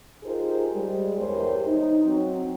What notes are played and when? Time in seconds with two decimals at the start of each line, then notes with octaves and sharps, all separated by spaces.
0.23 D#4 F4 G4 G#4 A#4 C5
0.72 G3 G#3
1.17 E2 G2 G4 A#4 C5 C#5
1.67 D#4
2.05 F#3 C4